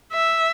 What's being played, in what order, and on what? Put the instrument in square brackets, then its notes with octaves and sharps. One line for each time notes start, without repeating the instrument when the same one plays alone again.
[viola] E5